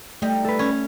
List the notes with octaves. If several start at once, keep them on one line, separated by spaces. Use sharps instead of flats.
G3 A3 D#4
A4 B4
C#4